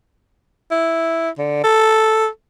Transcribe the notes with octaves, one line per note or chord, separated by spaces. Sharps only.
E4
D3
A4